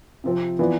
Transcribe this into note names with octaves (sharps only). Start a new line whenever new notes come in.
C3 F3 C4
E3 B3 F4 B4 D5